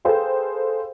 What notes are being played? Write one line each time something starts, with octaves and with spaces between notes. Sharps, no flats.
G#4 A4 B4 C5 F5 G5